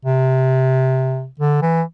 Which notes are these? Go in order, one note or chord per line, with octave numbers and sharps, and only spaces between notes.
C3
D3
E3